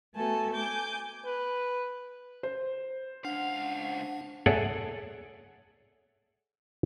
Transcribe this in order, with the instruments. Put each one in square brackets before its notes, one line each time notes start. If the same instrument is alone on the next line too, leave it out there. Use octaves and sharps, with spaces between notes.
[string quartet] A3 B3 F#4 A4 G#5 A5
G#5 D6 G6
[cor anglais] B4
[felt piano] C5
[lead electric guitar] C#2 F5 [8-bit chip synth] D4 [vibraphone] F#5
[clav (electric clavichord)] G#4 A4 C#5 D5 E5 F#5